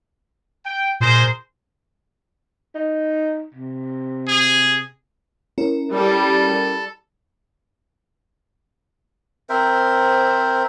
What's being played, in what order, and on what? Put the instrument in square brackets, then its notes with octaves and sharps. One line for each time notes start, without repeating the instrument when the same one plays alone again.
[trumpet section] G5
[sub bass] A#2 [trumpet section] G#4 A#4 C5
[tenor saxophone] D#4
C3
[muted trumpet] G#4
[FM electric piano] C#4 E4 A#4
[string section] G3 [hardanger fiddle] A4
[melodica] C4 A#4 C5 E5